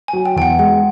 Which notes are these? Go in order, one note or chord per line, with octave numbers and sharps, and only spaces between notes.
G#5
F#3
G5
E2 G5
F#5
G#3 F#5